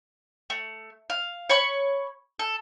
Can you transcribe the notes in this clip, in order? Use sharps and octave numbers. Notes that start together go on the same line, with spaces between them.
A3
F5
C#5 B5 C#6
A4